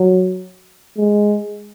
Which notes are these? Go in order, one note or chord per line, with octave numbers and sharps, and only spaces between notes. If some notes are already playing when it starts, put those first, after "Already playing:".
Already playing: F#3
G#3